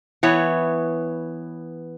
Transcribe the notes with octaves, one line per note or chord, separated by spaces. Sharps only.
E3 B3 C#5